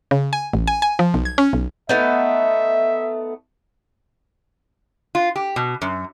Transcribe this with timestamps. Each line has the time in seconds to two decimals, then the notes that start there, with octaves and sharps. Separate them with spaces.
0.11 C#3
0.33 G#5
0.53 A1
0.67 G#5
0.82 G#5
0.99 F3
1.14 B1
1.25 G#6
1.38 C#4
1.53 B1
1.89 A3 B3 D#4 E5
5.15 F4
5.36 G4
5.56 B2
5.82 F#2